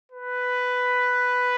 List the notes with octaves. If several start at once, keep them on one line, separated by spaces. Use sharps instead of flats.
B4